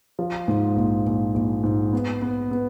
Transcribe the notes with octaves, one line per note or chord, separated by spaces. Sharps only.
F3
G#2
A#1
A#1
A#1
G#2
B3
B3
B3